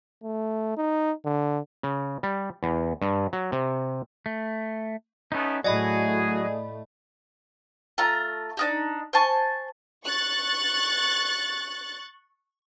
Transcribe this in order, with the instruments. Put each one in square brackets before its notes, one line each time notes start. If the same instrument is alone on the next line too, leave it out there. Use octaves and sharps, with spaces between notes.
[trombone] A3
D#4
D3
[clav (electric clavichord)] C#3
G3
E2
G2
F#3
C3
[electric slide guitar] A3
[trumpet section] A3 B3 [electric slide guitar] C#4 D#4
[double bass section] A2 A3 [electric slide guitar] F#3 F#4 [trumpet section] G#4 [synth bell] D5 D#5 B5
[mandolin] A3 F4 A#5
D4 D#4 G4
C5 G#5 A5 C#6
[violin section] C#6 F#6 A6